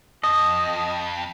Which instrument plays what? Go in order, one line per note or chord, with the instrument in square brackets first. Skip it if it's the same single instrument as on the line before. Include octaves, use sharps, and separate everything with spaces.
[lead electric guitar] F2 [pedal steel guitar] D#5